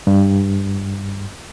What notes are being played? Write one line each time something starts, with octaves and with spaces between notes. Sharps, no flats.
G2